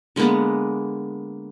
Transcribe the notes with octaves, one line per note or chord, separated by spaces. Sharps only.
D3 G#3 A#3 B3